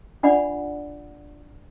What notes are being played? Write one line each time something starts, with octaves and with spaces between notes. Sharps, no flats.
D4 F4 D5 F#5 B5